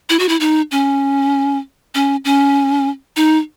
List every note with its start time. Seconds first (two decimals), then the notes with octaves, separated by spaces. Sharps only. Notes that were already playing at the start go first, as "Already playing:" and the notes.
0.10 E4
0.19 F#4
0.29 E4
0.40 D#4
0.71 C#4
1.95 C#4
2.25 C#4
3.16 D#4